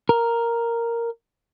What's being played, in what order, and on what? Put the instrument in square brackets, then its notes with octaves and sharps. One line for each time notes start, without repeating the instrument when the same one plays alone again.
[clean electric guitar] A#4